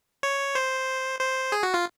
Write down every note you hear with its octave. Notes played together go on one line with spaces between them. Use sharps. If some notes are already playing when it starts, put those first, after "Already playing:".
C#5
C5
C5
G#4
F#4
F4